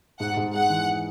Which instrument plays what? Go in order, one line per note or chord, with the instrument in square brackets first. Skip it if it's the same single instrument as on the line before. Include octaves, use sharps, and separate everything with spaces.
[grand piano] G#2 [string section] F#5
[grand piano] G#2
[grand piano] G#3 [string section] F#5
[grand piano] E3